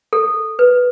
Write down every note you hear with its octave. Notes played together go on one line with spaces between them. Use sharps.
A4
B4